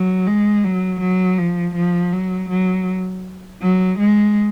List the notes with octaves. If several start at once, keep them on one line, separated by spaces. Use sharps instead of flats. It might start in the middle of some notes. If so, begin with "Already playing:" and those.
Already playing: F#3
G#3
F#3
F#3
F3
F3
F#3
F#3
F#3
G#3